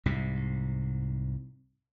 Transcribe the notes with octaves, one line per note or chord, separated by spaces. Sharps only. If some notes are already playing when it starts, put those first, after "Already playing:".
C2 G#2 C3